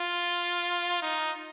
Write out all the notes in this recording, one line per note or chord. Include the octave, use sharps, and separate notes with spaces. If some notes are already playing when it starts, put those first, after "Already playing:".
Already playing: F4
D#4